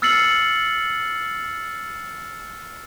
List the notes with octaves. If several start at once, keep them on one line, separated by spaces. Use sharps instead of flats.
E6 F6 A6 C7 C#7 F#7